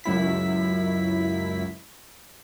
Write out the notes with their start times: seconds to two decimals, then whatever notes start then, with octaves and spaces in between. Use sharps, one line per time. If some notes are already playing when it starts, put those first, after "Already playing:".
0.04 C#2 F#2 E4 B6